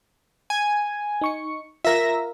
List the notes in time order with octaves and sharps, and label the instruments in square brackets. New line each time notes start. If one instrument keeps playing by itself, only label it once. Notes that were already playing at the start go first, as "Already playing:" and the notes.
[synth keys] G#5
[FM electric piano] D#4 C#6 C#7
[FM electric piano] F4 A#4 [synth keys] E5 A#6